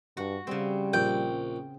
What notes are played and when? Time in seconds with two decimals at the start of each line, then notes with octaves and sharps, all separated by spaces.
0.17 G2 F#4
0.47 C#3 G3 C4
0.93 A#1 G5